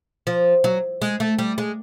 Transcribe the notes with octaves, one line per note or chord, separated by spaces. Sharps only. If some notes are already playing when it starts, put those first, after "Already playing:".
F3
F#3
G#3
A3
G3
G#3